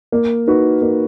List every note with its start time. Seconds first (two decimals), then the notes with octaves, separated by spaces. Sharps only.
0.12 A#3
0.47 D#4 F#4 B4
0.82 A#3